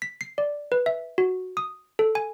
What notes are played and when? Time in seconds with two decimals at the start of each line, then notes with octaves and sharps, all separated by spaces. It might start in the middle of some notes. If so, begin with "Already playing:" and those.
0.02 B6
0.21 C7
0.38 D5
0.72 B4
0.86 E5
1.18 F#4
1.57 D#6
1.99 A4
2.15 G#5